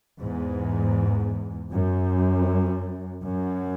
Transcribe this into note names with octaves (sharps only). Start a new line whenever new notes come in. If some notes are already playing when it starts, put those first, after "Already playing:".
E2 G#2
F#2
F#2